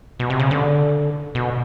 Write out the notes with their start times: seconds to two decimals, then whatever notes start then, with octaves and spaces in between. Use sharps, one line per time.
0.20 B2
0.30 C3
0.39 C#3
0.51 D3
1.35 B2